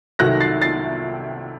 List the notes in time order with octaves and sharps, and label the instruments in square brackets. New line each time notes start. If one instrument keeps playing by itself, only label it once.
[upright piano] C2 C3 D#3 F#3 A3 F#6 A#6
A6 C7
A6 C7